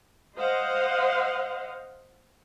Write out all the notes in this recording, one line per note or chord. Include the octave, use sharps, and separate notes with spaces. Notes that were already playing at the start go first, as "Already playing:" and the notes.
C5 D#5 F5 F#5